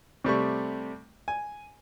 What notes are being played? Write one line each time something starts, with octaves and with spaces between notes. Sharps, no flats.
C3 G3 A3 C#6
G#5